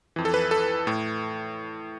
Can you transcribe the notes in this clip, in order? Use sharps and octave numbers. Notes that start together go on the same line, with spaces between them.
F2 E3
A4
B4
A4
A2